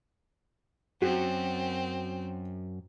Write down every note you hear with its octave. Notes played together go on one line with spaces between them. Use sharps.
F#2 C4 F#4